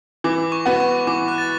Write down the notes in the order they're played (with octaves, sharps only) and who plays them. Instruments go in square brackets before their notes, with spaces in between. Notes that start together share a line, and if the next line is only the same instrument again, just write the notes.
[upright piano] E3 [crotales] D6
[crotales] C#6
[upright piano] B3 F#4 B4
[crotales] C#6
[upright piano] E3 [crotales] D6
[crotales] F#6
A6